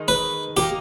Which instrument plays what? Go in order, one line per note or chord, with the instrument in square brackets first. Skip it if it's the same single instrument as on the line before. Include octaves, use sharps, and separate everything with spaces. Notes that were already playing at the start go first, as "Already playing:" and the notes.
Already playing: [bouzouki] D#3 G#3 D#4
[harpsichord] B4
[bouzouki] A#3 D#4 A#4 [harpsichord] G4